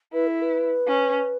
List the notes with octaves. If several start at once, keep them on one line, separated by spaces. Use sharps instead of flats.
E4 B4
A4
B4
C#4